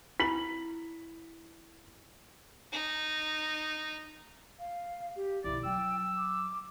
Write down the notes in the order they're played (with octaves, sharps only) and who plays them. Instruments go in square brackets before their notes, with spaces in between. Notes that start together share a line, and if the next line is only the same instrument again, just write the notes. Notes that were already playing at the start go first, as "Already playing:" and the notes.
[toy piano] E4 B5 [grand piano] B6 F#7
[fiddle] D#4
[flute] F5
G4
[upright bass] B1 F2 [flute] E4 [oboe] D5
[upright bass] F#3 [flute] G5 [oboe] E6
[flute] D6